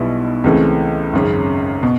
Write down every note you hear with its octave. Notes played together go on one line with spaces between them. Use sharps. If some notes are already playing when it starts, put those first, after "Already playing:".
Already playing: B1 B2 G3 B3 E4
C#2 C#3 E3 A3 C4
G#1 F#2 C#3
B2